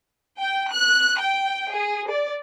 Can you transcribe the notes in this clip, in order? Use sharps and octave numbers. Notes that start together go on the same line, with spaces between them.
G5
F#6
G5
G#4
D5